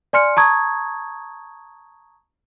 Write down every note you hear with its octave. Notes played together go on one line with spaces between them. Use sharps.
D5 G#5 C6 F6 C#7
A5 A#5 C#6 D#6 G#6